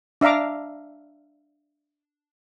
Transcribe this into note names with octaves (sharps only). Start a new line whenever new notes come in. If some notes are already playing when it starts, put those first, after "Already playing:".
D4 E5 F5 A#5 D6